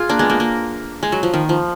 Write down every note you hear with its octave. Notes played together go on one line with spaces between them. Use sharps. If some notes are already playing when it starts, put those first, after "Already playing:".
Already playing: F4 G#4
A#3 D4
G#3 B3
A#3
A#3
G#3
F#3
F3
D#3
F3